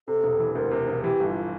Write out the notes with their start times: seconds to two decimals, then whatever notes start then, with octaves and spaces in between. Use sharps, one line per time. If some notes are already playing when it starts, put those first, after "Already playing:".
0.08 C3 A4
0.24 E1
0.39 E3
0.55 D2 A#4
0.71 C3
0.88 E1
1.03 E3 G4
1.20 G1
1.28 F4